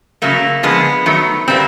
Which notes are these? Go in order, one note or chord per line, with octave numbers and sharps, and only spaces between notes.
C#3 F#3 A3 A#3
D3 F3 G#3 B3
D#3 F#3 A3
A#2 G3 A#3 C4